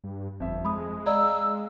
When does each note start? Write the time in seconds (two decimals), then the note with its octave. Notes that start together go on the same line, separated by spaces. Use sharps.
0.04 G2
0.40 G1 F2 E5
0.65 G#3 B5 D#6
1.06 D5 D#5 F5 A#5 E6